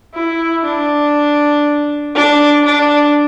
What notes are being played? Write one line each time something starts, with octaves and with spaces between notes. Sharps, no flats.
E4
D4
D4
D4